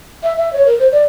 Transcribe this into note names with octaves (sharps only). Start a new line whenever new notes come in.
E5
E5
C#5
A#4
C5
D5